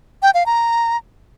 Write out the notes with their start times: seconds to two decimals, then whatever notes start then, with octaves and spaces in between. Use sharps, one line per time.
0.22 G5
0.34 F5
0.46 A#5